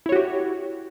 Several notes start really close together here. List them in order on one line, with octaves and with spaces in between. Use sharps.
E4 C#5 F#4 G4